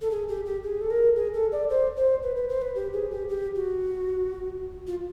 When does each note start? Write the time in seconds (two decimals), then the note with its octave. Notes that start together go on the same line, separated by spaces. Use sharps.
0.01 A4
0.11 G#4
0.28 G4
0.46 G4
0.64 G#4
0.81 A4
0.91 A#4
1.16 G#4
1.34 A4
1.52 D5
1.70 C5
1.97 C5
2.23 B4
2.36 B4
2.49 C5
2.62 B4
2.75 G4
2.93 G#4
3.11 G4
3.29 G4
3.55 F#4
4.87 F4